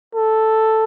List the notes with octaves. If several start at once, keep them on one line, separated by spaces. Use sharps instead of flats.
A4